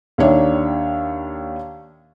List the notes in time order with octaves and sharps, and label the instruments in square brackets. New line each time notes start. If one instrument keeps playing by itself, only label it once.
[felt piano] D#2 D#3 D4 C#5 E5